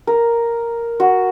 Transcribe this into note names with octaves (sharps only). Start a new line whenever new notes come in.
A#4
F#4